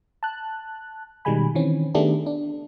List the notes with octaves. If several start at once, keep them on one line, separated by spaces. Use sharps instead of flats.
A5 F#6
B2 D#3 G3 G#3 G#5 B5
D#3 E3 C4 C#4
D#3 A3 B3 D4 G4 G#4
D4